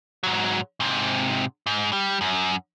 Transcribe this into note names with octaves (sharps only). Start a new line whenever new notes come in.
G#2 F#3
G#2 C3
G#2
G3
F#2